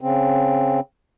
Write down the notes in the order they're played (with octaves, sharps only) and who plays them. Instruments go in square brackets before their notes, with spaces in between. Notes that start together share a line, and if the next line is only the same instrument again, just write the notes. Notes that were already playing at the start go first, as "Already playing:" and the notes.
[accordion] C#3 C4